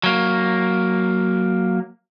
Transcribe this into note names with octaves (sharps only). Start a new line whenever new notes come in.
F#3 A#3